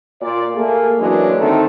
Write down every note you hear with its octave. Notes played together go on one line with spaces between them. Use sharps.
A#2 D5
A3 A#3 G#4
E3 F#3 G#3 A#3 C#4 D4
D3 D#3 A3 C4 D#4